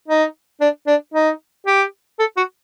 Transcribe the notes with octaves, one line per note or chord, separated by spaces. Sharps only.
D#4
D4
D4
D#4
G4
A4
F#4